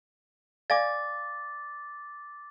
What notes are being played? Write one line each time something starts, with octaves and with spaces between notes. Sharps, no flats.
D5 F5 G#5 D6 A6